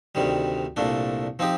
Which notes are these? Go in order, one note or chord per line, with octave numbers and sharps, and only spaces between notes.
D2 C3 D#3 G3
C2 A#2 A3 D4
F3 C4 D#4 G4